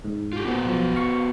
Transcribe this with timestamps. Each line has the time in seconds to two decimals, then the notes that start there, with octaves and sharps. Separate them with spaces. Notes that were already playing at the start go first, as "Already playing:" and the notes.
0.04 G#2
0.33 F4 G4
0.45 A#2 B3 F#4 C5
0.65 B1 F3
0.96 F5 C#6